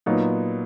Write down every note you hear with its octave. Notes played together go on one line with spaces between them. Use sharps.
A#2 F#3 B3 D#4